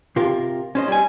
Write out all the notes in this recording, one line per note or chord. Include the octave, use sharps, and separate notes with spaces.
C3 F4 A#4
C#4 C5 D#5
G3 G#5